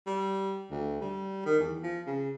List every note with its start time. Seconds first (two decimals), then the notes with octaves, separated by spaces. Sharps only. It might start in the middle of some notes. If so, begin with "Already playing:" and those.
0.07 G3
0.71 D2
1.01 G3
1.46 D#3
1.60 E2
1.83 F3
2.07 C#3